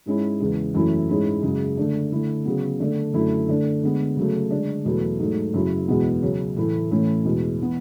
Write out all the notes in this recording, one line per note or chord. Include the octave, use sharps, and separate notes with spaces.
G#2 G#3 C#4 E4
E2 C#3 G#3
F#2 E3 A3 C#4 E4
G#2 G#3 C#4 E4
F#2 C#3 G#3
D3 A3 D4
D3 A3 E4
C#3 F#3 B3
D3 A3 D4
F#2 D3 A3 E4
D3 A3 D4
D3 G#3 B3
C#3 F#3 A3
D3 G#3 D4
E2 B2 F#3 A3 E4
G#2 F#3 A3
F#2 C#3 F#3 C#4 E4
E2 B2 G#3 B3
C#3 F#3 C#4
A2 E3 A3 E4
A2 E3 A3 C#4 E4
E2 B2 G#3
E3 B3